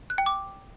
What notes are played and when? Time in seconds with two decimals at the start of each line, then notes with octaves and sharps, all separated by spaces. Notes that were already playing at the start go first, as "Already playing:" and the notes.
0.10 F#6
0.18 G5
0.26 D6